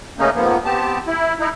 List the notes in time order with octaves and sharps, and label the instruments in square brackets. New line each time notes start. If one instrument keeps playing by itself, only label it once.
[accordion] C#3 A3 A#3 C#4 D#4
F2 G#2 F3 A#3 B3
B3 C4 G4 A5
E4
D#4 E4